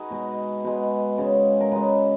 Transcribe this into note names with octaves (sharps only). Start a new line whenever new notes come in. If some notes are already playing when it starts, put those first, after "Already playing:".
Already playing: D#4 F#4 G#4 B4
B2 G#3
B2 G#3 B4
C#3 G#3
A#4
C#3 G#3 B4